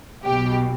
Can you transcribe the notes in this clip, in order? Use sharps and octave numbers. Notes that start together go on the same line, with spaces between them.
B1 B2 G4